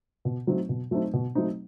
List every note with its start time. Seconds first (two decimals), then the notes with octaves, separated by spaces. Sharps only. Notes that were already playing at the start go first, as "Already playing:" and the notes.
0.25 B2
0.47 F#3 A3 C4 D#4
0.69 B2
0.91 F#3 A3 C4 D#4
1.13 B2
1.35 F#3 A3 C4 D#4